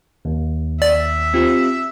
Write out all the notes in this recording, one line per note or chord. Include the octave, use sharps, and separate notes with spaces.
D#2
D5 E5
C4 F4 G4